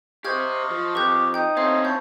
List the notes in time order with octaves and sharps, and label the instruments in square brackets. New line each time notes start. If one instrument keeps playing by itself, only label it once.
[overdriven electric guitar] G4 C5 [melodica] D#5 F5 C#6 [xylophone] F6 G6 G#6
[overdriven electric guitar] F3
[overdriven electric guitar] F2 [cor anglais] G4 [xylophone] B4 G6
[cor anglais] D#4 [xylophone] G5 G6
[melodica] A3 F4 D#5 [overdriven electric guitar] C4 C#4 [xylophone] C5 F5
[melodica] E4 C#5 A5 [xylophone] G6